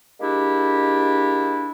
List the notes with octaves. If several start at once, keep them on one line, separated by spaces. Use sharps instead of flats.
G#3 A#3 D4 E4 G4